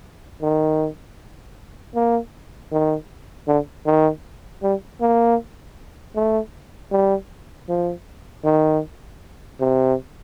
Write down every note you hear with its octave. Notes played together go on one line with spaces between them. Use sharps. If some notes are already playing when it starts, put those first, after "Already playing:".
D#3
A#3
D#3
D3
D#3
G3
A#3
A3
G3
F3
D#3
C3